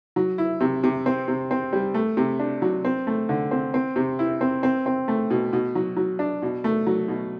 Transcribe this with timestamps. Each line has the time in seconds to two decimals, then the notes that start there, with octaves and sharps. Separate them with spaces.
0.16 F#3
0.38 E4
0.60 C3
0.84 C3
1.06 C4
1.28 C3
1.51 C4
1.73 G3
1.94 A3
2.17 C3
2.40 D4
2.62 F#3
2.85 C4
3.07 A3
3.29 D3
3.51 C4
3.74 C4
3.96 C3
4.19 E4
4.41 C4
4.63 C4
4.86 C4
5.08 A3
5.30 B2
5.53 B2
5.75 F#3
5.96 F#3
6.19 D4
6.42 B2
6.64 A3
6.87 F#3
7.08 B2